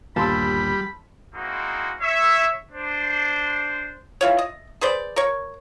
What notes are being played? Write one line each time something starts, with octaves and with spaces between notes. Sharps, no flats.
G1 D#2 A#2 G3 A5 B5 C6 E6
G#3 A#3 C4 D#4 E4 F#4
C#5 E5
D4 C5
E3 F4 C#5
D#5
G#4 B4 C5 D5
A#4 C#5